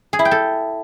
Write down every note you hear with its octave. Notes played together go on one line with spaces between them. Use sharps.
G#4
E4
G5
A4